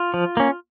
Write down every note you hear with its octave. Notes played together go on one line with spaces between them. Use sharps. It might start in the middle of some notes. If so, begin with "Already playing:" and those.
Already playing: F4
F3
A#3 C#4